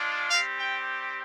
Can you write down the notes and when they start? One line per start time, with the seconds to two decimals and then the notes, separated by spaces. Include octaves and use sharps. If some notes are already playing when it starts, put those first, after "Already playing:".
Already playing: G#3 D4 F4
0.30 G3 C4 G4 F5
0.58 G5